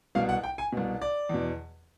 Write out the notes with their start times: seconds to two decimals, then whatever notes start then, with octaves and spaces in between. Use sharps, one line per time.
0.15 C2 B2 F5
0.29 F#5
0.43 G5
0.58 G#5
0.72 C2 B2
1.02 D5
1.29 E2 B2